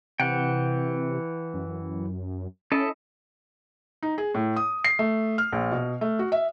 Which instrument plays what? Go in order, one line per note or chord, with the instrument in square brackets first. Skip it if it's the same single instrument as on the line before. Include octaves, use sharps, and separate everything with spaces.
[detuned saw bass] C3 [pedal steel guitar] E3 F#5 G5
[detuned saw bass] F#2
[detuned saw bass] C#4 [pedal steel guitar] E4 A4 D#5
[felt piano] D#4
G#4
A2
D#6
C7
A3
F6
A#1
B2
A3
F#4
E5